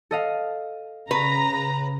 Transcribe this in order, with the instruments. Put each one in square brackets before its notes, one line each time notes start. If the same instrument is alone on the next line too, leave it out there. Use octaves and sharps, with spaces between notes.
[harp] A4 D#5 F5
[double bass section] C#3 [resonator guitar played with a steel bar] B4 [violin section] A#5